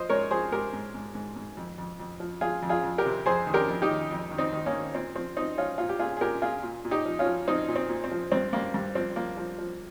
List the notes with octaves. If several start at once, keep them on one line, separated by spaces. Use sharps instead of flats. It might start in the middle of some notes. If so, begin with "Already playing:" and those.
Already playing: F3 C5 D#5
G#2 A#4 C#5
F3 G#4 C5
G#2 G4 A#4
G#2
G#2
G#2
G#2
F2
F2
F2
F3
F3 F4 G#4
F2
F4 G#4
F2
G4 A#4
C3
F2 G#4 C5
D#3
G4 A#4
F2
D#4 G4
D#3
F2
D#3
C4 D#4
D#3
A#3 C#4
D#3
A#2 C4
F3 C4
F3 C4 D#4
F3 C#4 F4
A#2 F4
G4
A#2 F4 G#4
G#4
A#2 G4 A#4
A#2 F4 G#4
A#2
A#2
D#4 G4
F3
C#4 F4
F3
F3 C4 D#4
A#2
C4
A#2
C4
F3
G2 C4
G2 A#3
G2
F3 C4
F3 A#3
F3
F3